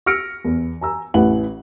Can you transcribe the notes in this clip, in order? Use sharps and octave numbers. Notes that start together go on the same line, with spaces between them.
E6 F6 A#6 C#7 D7
E2
G#5 A#5 E6
A1 E4 B4 F#5 F#7